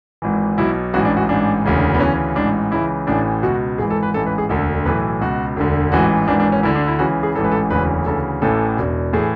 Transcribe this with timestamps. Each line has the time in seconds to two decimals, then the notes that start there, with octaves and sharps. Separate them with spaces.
0.22 G#1 G#2 E3
0.58 B1 B2 E4
0.94 A1 G#2 E3 F#4
1.05 D4
1.17 F#4
1.29 A1 G#2 E3 D4
1.64 E1 D2 C#3 E3
1.94 B3
2.00 D2 C#3 E3 C#4
2.36 A1 G#2 E3 D4
2.72 C#2 C#3 E3 E4
3.07 A1 A2 E3 D4
3.43 C#2 B2 F#4
3.78 G#1 G#2 E3 G#4
3.90 A4
4.03 B4
4.14 A1 G#2 E3 A4
4.26 B4
4.38 G#4
4.49 E1 D2 D3 A4
4.85 B1 A2 E3 B4
5.21 C#2 B2 F#4
5.56 E1 D2 D3
5.92 A1 G#2 E3 F#4
6.28 G#1 G#2 E3 D4
6.40 D4
6.52 C#4
6.63 D2 D3 E4
6.75 D4
6.87 E4
6.99 C#2 C#3 E3 F#4
7.23 G#4
7.35 A1 G#2 E3 A4
7.44 B4
7.52 A4
7.70 E1 D2 C#3 E3 B4
8.06 D2 C#3 E3 A4
8.42 A1 A2 E3 A4
8.77 E1 E2 B2
9.13 A2 E3 G#4